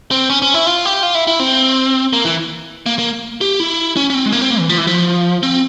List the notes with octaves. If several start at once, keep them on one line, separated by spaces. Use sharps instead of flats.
C4
C#4
C#4
E4
F4
G4
F4
E4
E4
C4
A#3
E3
A#3
A#3
G4
E4
C#4
C#4
C4
G#3
A#3
C4
A#3
E3
F3
E3
F3
C4